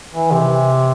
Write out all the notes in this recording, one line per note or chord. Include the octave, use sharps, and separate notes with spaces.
E3
C3